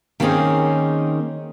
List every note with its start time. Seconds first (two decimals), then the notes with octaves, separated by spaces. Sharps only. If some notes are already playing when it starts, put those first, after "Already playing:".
0.20 D#3 A#3 C4 C#4 D#4 G#4